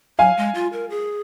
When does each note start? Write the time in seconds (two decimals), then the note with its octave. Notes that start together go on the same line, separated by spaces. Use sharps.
0.19 F#3 F5 G#5
0.37 G#3
0.55 F4
0.73 A#4
0.90 G#4